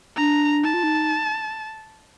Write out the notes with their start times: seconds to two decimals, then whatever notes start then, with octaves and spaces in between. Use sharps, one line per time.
0.17 D4 A#5
0.64 D#4 A5
0.74 F4
0.83 D#4